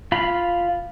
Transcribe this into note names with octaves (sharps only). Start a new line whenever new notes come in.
F4 F5 B5